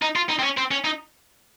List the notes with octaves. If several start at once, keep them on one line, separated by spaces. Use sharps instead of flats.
D#4
F4
D#4
C4
C#4
C4
C#4
D#4